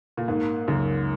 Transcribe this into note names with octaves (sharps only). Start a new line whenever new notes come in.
A#2
G#2 A#3
C#2 F#2